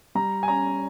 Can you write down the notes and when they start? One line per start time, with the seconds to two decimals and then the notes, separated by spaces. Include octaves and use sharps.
0.15 G3 A#5
0.43 G#5
0.48 C#4 A#5